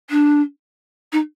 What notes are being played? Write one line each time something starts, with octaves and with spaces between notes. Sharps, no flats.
D4
D#4